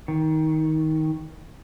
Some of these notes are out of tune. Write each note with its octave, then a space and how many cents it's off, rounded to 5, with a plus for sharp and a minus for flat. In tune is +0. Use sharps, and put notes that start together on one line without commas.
D#3 +20